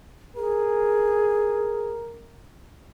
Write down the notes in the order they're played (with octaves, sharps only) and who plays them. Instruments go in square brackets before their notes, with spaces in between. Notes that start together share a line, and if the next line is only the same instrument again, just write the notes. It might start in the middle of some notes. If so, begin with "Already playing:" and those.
[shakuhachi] G#4 [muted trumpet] A#4